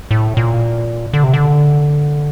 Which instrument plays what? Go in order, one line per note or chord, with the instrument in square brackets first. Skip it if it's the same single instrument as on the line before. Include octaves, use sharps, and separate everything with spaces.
[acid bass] A2
A#2
D3
C3
D3